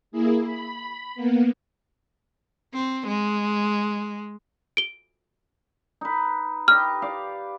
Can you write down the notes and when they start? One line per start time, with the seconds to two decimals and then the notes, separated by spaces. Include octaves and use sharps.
0.12 A#3 E4 G#4
0.44 B5
1.15 A#3 B3
2.74 C4
3.08 G#3
4.77 D7 G7
6.01 D#4 B4
6.68 G4 B4 D#5 F6
7.02 D5 F5